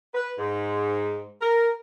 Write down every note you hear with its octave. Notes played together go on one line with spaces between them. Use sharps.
B4
G#2
A#4